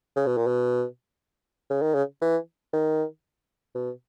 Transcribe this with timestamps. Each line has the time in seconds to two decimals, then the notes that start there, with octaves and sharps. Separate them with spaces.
0.16 C#3
0.27 B2
0.37 A#2
0.47 B2
1.70 C#3
1.82 D#3
1.95 C#3
2.22 E3
2.73 D#3
3.75 B2